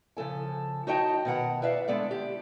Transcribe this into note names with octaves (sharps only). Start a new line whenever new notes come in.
C#3 F3 A4 G#5
D#4 F#4 C#5 D#5 G5 A5
B2 D#3 F#5 A#5
B4 D5 E5 F5
D3 G#3 B3 A4 D5
G4